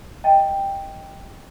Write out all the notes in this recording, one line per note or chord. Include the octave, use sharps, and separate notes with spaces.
D#5 G5 A5